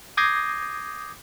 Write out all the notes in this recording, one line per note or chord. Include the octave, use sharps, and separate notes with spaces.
D6 D#6 G6 G#6 A#6 C7